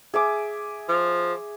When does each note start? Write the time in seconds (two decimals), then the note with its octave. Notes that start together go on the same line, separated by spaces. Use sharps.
0.14 G#4 E5 D6
0.89 F3